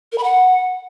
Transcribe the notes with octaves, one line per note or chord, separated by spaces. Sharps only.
A#4
B5
F#5